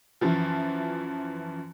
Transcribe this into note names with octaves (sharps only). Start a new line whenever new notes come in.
F#2 E3 F3